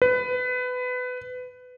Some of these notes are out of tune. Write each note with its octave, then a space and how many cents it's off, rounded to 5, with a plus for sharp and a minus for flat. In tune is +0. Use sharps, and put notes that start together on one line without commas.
B4 +20